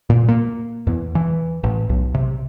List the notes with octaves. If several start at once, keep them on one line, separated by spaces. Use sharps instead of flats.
A#2
A#3
E2
E3
A1
B1
C3